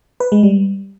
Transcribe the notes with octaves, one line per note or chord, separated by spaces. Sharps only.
B4
G#3
G3